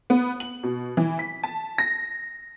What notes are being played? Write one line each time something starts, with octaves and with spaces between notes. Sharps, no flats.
B3
F#7
B2
E3
B6
A5
A#6